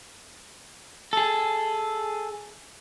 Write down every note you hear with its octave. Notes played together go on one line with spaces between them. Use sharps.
G#4 A4